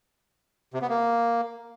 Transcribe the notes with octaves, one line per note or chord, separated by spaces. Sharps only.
C3
B3
A#3